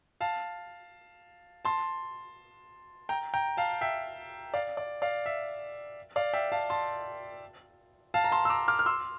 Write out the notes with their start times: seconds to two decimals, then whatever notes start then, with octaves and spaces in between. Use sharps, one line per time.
0.21 F5 A5
1.65 A5 C6
3.09 G5 A#5
3.34 G5 A#5
3.57 F5 A5
3.81 E5 G5
4.54 D5 F5
4.77 D5
5.02 D5 F5
5.26 E5
6.16 D5 F5
6.34 E5 G5
6.52 F5 A5
6.70 A5 C6
8.14 F5 A5
8.24 A#5
8.32 A5 C6
8.45 E6
8.50 A#5 D6
8.68 D6 F6
8.79 F6
8.86 C6 E6